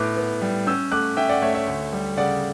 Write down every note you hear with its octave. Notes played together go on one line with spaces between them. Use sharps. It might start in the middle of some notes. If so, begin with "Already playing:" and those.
Already playing: A2 B3 D6 F#6
B3
G3
C#4 E6 G6
A3 D6 F#6
C#4 E5 G5
D5 F#5
A3 C#5 E5
C#5 E5
D2
G3
C#3 D5 F#5